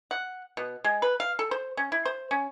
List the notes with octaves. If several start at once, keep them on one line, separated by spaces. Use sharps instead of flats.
F#5
B2
G#3
B4
F5
A4
C5
C#4
E4
C5
C#4